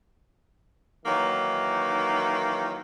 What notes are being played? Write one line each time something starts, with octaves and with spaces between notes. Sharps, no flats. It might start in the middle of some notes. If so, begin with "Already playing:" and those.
D#3 E3 F#3 A#3